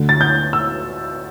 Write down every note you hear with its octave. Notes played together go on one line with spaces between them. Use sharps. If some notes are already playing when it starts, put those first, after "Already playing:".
Already playing: D2 D3
A6
G6
E6